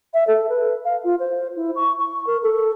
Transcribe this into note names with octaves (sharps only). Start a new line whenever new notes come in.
E5
A4
B4
F5
F4
C5
E4
C#6
C#6
A#4
A4